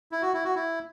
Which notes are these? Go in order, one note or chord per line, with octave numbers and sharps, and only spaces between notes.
E4
F#4
E4
F#4
E4